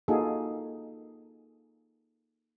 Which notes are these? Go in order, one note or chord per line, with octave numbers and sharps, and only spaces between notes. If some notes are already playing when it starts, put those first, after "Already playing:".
A#3 D#4 F4 F#4 G#4 A4